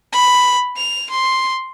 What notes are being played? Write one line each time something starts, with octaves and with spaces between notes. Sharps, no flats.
B5
F7
C6